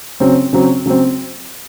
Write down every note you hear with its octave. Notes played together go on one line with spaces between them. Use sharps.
C#3 F#3 C4
C#3 F#3 C4
C#3 F#3 C4